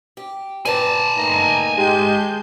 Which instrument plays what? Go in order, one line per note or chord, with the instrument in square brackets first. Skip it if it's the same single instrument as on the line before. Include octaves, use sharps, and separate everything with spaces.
[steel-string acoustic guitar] G4
[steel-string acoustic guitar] A#2 B4 D5 [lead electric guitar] G#5 A5
[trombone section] A3 A#3 D#4 [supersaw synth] A#5
[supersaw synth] G#3 G6 [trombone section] G4